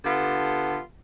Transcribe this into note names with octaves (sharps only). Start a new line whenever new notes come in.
D3 B3 F4 G4 A4